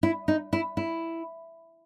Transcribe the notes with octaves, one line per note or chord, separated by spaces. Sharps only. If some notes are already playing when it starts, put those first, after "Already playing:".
E4
D#4
E4
E4